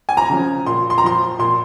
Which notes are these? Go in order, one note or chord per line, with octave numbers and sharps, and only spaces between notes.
G#5
A#5
C#3 F3
A#2 C6
C6
A#5
F3 C6
A#2 C6